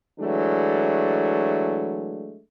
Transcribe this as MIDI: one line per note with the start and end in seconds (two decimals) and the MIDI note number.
0.20 2.38 52
0.20 2.38 54
0.20 2.38 56
0.20 2.38 57
0.20 2.38 62